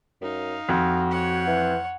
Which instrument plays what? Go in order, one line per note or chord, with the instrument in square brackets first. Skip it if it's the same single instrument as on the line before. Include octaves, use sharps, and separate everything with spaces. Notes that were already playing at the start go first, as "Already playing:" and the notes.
[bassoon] F#2 [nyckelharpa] D#4 F5
[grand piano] F2 [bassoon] F#4
[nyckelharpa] C#5 F#5
[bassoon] E3